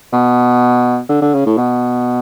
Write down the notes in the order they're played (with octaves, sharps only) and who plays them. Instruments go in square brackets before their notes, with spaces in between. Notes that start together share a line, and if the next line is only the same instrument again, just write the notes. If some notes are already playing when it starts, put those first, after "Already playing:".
[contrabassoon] B2
D3
D3
C#3
A2
B2